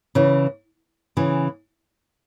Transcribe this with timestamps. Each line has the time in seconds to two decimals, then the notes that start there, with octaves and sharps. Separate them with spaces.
0.15 C#3 E3
1.17 C#3 E3